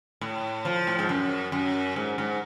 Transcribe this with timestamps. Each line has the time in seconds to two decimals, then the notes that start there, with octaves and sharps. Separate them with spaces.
0.21 A2
0.65 F3
0.87 A2
0.99 G#2
1.09 F#2
1.52 F#2
1.96 G#2
2.18 G#2